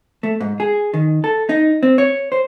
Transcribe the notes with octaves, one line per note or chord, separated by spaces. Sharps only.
A3
G#2
G#4
D#3
A4
D#4
C4
C#5
C5